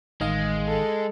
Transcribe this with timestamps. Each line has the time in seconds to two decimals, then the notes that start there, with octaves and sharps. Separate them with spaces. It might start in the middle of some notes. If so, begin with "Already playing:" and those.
0.21 A1 D#3 G#3 D#5 F5
0.68 A4